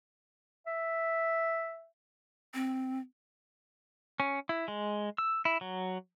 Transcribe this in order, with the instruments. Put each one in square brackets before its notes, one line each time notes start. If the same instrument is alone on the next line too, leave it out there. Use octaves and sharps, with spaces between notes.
[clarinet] E5
[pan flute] C4
[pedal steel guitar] C#4
E4
G#3
E6
E4
F#3